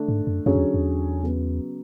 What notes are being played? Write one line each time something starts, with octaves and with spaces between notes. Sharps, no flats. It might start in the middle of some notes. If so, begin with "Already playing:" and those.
Already playing: D3 A3 D4
G#2
F#2
F#2 D3 F#3 C#4 G#4 C#5
E2
E2
C#3 F#3 B3